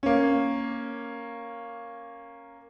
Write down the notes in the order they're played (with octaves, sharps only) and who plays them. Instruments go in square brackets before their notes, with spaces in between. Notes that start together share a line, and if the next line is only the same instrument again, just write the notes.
[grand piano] A#3 C#4